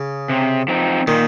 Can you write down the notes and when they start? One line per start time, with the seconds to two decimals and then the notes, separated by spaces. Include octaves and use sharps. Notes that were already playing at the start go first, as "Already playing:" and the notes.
Already playing: C#3
0.29 C3
0.68 F3 C4 D#4
1.07 A#2 D#3